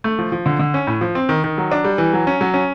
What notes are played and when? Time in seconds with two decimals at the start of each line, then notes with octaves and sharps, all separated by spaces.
0.04 A3
0.19 F3
0.32 F3
0.46 D3
0.59 D3
0.74 C#4
0.87 A2
1.01 F3
1.15 C4
1.29 D#3
1.44 D#3
1.58 F#3
1.72 D4
1.84 G3
1.98 E3
2.13 F#3
2.27 C#4
2.41 F#3
2.54 C#4